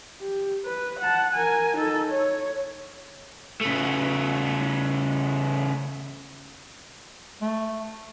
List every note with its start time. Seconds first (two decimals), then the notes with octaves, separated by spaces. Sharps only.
0.21 G4
0.65 B4
0.99 F#5 A5
1.34 A#4 G#5
1.77 D#4 A4
2.10 C#5
3.61 C#3 A3
7.42 A3